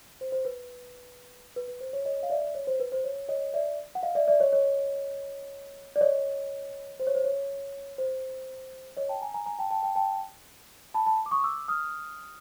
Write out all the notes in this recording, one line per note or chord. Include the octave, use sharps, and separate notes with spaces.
C5
C5
B4
B4
B4
C5
C#5
C#5 D#5
F5
D5 E5
C#5
C5
B4
C5
C#5
C#5 D#5
D5 E5
F#5
D#5 F5
D5 E5
D5 E5
C#5 D#5
C#5 D#5
D5
C#5 D#5
C5
C#5
C5
C#5
C5
C#5 D#5
G5 A5
G#5 A#5
G#5 A#5
G#5 A#5
G5 A5
G5 A5
G5 A5
G5 A5
A5 B5
A5 B5
D6
C#6 D#6
D6 E6
D#6 F6